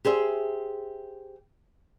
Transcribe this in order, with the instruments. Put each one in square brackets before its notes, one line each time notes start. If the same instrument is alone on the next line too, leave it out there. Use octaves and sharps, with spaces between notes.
[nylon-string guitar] G4 G#4 C5 E5